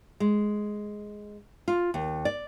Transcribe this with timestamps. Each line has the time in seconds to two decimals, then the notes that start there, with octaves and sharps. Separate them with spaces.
0.20 G#3
1.68 F4
1.94 D#2
2.25 D5